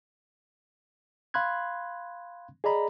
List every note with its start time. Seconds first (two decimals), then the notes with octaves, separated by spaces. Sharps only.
1.34 F5 B5 C6 F#6 G#6
2.64 G#4 D5 D#5 A#5 B5